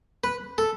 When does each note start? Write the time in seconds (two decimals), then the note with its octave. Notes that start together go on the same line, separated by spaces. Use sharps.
0.24 B4
0.58 A4